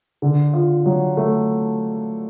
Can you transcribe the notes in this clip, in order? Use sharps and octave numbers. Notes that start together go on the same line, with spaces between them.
D3
F4
F#3
A3